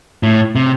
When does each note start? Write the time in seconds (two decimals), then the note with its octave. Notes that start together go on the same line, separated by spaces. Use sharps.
0.23 A2
0.55 C3